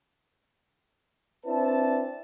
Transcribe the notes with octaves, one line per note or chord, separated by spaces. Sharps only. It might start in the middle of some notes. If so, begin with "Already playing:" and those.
C4 D4 E4 B4 C5 A5